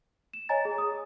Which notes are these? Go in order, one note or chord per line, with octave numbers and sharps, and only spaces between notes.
E7
C#5 D#5 G#5 A#5 A6
G#4
D#6